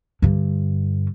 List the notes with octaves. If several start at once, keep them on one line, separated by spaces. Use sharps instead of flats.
G2 D3